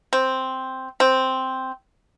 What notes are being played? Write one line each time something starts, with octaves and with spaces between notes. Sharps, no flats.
C4
C4